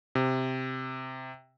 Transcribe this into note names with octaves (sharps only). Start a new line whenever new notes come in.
C3